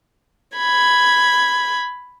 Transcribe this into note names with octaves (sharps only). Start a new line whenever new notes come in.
B5 G#6